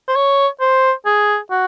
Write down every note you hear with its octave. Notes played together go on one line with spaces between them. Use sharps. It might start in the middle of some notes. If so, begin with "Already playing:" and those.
C5
C#5
C5
G#4
F#4